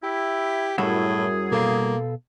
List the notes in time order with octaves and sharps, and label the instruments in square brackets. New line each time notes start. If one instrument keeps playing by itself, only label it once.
[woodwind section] E4 [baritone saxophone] G4
[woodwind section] F#2 G#4 [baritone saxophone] A2 [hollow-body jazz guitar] G3 E4 F#4
[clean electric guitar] B2 A4 F5 [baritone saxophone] A#3